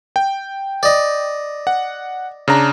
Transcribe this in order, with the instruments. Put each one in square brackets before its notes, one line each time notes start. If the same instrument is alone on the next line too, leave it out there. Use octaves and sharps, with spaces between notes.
[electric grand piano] G5
[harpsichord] D5 D#5
[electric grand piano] F#5
C#3 D4 A#5